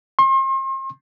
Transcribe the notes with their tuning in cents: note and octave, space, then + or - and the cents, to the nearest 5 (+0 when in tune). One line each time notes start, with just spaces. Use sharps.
C6 +40